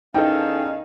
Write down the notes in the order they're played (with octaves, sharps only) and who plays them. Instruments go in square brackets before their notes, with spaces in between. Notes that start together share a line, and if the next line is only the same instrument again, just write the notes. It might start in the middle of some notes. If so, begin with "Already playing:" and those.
[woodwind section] E2 C#4 F5 [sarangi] D#3 [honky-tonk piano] D#4 A4 [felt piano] G5